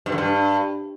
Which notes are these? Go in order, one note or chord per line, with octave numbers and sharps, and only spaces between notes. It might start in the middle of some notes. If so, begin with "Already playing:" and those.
G2
D3
G2